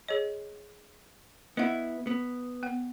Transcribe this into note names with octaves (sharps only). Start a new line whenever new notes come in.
G#4 C#5 D#5
B3 E4 D#5 F#5
B3
B3 F#5